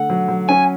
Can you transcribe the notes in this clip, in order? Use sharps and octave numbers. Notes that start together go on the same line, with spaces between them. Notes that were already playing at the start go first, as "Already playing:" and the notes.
Already playing: D3 A3 F#5
F#3
F#3
C#4 G#5